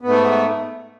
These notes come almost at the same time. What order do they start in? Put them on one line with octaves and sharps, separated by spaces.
B3 G#2 A3